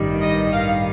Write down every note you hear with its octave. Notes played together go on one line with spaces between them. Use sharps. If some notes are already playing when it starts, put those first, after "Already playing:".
Already playing: A1 G2 D#3 G3
D#5
F5